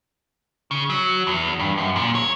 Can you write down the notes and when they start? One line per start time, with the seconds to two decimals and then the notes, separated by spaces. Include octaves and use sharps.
0.71 C#3
0.90 F#3
1.27 E2
1.60 G2
1.78 F#2
1.96 A#2
2.15 C#5